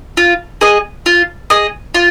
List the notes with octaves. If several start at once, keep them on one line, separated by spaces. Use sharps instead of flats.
F4
G#4 D#5
F4
G#4 D#5
F4